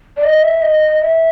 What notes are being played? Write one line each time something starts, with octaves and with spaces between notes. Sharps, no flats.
D5
D#5
E5
D#5
E5